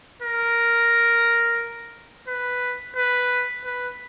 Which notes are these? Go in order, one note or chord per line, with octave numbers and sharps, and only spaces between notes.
A#4
B4
B4
B4